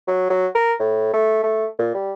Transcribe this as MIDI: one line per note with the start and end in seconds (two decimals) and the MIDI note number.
0.07 0.28 54
0.30 0.47 54
0.55 0.73 70
0.80 1.13 45
1.13 1.41 57
1.44 1.66 57
1.79 1.91 46
1.94 2.13 55